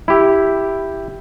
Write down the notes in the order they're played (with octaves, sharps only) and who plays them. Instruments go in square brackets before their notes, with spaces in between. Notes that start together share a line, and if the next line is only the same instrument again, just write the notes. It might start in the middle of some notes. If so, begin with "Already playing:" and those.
[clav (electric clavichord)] E4 G4